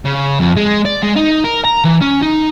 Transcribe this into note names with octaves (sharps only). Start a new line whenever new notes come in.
C#3
F2
G#3
D5
G#3
D#4
A#4
A#5
E3
C#4
D#4